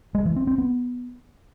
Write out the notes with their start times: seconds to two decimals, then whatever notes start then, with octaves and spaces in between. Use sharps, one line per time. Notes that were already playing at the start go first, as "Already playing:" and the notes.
0.15 G#3
0.25 E3
0.36 C4
0.47 C4
0.58 B3